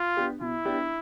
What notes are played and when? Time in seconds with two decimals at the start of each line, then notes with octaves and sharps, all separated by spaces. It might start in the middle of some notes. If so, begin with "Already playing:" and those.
Already playing: F4
0.17 B3 D4 G4
0.41 B2 E4
0.65 B3 D4 G4